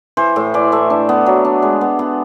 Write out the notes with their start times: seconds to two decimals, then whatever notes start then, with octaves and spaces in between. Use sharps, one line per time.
0.17 E3 C5
0.36 A2
0.54 E3 D5
0.72 A3 E5
0.90 D4
1.09 B3
1.26 F#3
1.45 D4
1.62 G#3
1.81 B3
1.99 B3